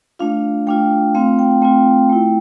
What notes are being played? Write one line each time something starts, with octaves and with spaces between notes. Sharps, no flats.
A3 D4 F4 F5
A3 D4 F4 G5
A3 C4 F4 F5
G5
A3 C4 F4 G5
A3 E4